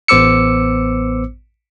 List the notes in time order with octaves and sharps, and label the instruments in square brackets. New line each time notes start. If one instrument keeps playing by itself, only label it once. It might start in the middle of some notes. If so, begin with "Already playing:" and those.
[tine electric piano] A1 B3 C5 D6 E6 C#7